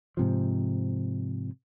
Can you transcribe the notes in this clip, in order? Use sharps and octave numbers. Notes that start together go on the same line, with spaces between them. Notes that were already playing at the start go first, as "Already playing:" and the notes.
G#2 C3 F3